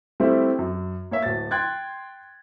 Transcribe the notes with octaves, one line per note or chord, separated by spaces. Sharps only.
G3 A3 C4 E4
F#2
A#3 C#5 E5
D1 A6
G5 C6 F#6 G#6 A6